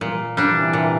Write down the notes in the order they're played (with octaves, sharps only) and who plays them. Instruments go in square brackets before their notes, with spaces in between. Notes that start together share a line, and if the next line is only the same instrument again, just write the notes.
[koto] A#2 [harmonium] E3 G3
[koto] G3 D4
[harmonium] C3 E3
[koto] A#2